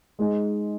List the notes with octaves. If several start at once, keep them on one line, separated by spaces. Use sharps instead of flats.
G#3 D#4 G#4 D#5